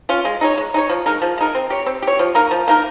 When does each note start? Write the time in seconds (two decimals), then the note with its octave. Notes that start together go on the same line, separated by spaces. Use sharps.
0.09 C#4 F4
0.25 G#3
0.41 D#4 G#4 C#5
0.57 G#3
0.74 D#4 G#4 C#5
0.89 F3
1.06 G#3 D#4 A#4
1.22 F3
1.38 G#3 D#4 A#4
1.55 C4
1.70 G4 C#5
1.86 C4
2.02 G4
2.07 C#5
2.19 F3
2.35 A#3 D#4 A#4
2.51 F3
2.68 A#3 D#4 A#4